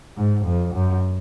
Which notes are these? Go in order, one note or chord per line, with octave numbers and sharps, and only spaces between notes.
G#2
F2
F#2